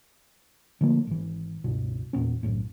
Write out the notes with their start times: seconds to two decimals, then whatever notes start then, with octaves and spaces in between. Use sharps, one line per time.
0.81 D3 F3 A3 A#3
1.07 G#1 E3
1.64 C#2 G2 B2
2.13 E2 A#2 B3 C#4
2.43 B1 F#2 A2